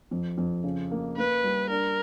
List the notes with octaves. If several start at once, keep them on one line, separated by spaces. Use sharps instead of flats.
F2
F2
C#3
A#3
A#3 B4
G3
D4 A#4